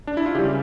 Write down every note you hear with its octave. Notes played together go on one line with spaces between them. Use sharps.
D4
E4
F4
C#3 E3 G3 G4